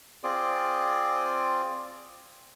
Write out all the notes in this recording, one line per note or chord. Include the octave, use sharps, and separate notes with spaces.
C4 F4 G#4 D5